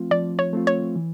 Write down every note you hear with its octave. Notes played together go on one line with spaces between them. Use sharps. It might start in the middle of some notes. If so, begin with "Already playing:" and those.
Already playing: F3 A3 C4 F4
F3 D5
C#5
A3 C4 F4
C#5
E3